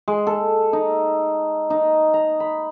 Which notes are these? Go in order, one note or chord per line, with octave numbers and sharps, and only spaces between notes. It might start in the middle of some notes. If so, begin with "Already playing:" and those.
G#3
A4
D#4
D#4
A#5
B5